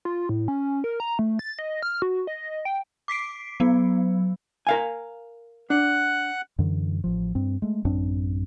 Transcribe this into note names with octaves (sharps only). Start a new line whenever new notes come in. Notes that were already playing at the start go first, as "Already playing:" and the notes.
F4
A2
C#4
A#4
A#5
A3
A6
D#5
F6
F#4
D#5
G5
D6 B6 C7 D7
F#3 B3
A#4 F5 G#5
D4 F#5 F#6
F#2 D3 E3
A1 F3
G2 C4
G#3 A3
A1 F#2 C4 D4